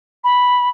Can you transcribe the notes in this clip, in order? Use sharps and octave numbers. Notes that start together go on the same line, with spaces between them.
B5